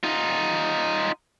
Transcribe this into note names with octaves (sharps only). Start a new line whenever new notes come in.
D#4 F4